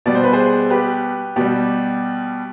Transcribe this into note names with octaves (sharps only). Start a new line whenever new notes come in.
B2 G3 D5
C5
B4
G#4 C5
G4 B4
B2 G3 G4